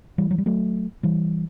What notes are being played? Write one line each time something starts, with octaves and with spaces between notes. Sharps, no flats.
E3 G3
F#3
G3
F#3 A3
E3 G3